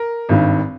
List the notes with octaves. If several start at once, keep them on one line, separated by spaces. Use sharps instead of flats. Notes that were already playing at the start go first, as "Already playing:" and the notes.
Already playing: A#4
G#1 G2 D#3